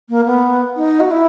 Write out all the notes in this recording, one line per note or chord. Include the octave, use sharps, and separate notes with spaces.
A#3
B3
D#4
F#4
E4